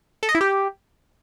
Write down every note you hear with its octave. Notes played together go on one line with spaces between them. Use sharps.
A4
D#5
E4
G4